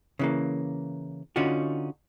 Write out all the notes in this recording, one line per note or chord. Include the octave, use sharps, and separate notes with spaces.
C#3 E3 A#3
D3 C#4 D#4 F4 F#4